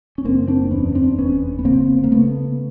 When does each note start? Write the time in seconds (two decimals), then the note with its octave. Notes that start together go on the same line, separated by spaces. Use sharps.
0.18 C#4
0.24 F#1 A#3 C4
0.48 C4 D4
0.71 E2 B3 C#4
0.95 C4 D4
1.18 F1 B3 C#4
1.59 B3
1.65 C#3 A#3 C4
2.04 A#3
2.11 C#3 A3 B3